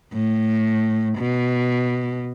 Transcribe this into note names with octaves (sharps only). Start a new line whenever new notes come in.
A2
B2